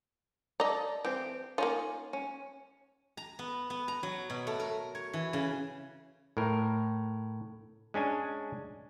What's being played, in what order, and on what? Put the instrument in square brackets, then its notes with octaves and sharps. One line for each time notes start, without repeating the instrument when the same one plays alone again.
[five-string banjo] A4 D5 [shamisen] D#5 A#5
[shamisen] E3 [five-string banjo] C4 G4
[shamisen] A#3 D#4 F4 [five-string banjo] C#4
[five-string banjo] C#4
[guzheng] A#5
B3
B3
A#5
F#3
B2
A3
A#4
C#5
E3
C#3
[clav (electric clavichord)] A2 A#4
G#3 C#4 D4 G#5